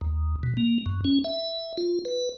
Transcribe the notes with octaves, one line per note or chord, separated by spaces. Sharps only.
D#2
B2
A#3
F#2
C#4
E5
F4
B4